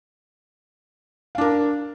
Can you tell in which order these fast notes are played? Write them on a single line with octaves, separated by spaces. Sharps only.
F5 D4 A#4